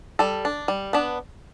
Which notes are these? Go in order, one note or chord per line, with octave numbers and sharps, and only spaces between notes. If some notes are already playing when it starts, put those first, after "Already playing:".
G3 A4
D4
G3
B3 D4